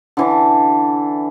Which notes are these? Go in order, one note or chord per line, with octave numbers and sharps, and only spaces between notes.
D3 E3 D4